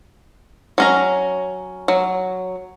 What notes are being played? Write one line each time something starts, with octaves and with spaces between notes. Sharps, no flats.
F#3 C#4 A#5
F#3